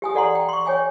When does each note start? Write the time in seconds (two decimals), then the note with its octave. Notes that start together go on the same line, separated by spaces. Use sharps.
0.02 G4 G#5 D#6
0.14 G4 A4 D5 F#5 A#5 C6
0.35 G5
0.49 C6 C#6
0.66 C#5 G5 G#5 D6